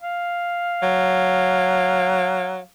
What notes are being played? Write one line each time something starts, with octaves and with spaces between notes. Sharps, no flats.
F5
F#3